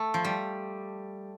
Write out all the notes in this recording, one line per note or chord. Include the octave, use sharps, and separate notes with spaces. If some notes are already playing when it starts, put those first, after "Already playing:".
Already playing: A3
F3
G3